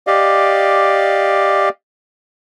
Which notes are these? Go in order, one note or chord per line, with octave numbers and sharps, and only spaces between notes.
G4 D5 D#5 F5